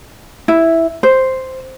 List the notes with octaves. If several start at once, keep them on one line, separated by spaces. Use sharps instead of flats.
E4
C5